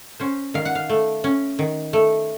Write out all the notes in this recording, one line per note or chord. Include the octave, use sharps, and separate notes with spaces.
C#4 C5
D#3 F5
F#5
F5
A3
C#4
D#3
A3